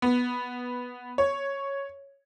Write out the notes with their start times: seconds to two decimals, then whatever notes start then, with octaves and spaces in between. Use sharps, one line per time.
0.02 B3
1.18 C#5